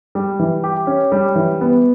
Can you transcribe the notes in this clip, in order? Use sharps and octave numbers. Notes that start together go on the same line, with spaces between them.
G3
E3
G4
C#4
G3
E3
B3